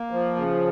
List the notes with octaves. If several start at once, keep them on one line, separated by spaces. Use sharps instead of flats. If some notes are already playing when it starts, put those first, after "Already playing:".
Already playing: A#3
F3
C#3